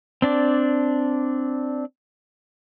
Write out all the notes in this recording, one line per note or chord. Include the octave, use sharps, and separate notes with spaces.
C4 D4 D5